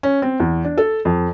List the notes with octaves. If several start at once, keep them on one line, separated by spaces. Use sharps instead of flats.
C#4
C4
E2
D4
A4
F2